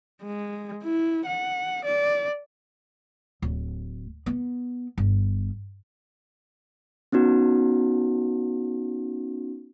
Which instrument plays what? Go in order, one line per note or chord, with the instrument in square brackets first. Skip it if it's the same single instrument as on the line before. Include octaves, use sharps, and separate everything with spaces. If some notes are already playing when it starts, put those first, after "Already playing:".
[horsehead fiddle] G#3
E4
F#5
D5
[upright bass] D1
B3
G1
[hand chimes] B3 C#4 D#4 F#4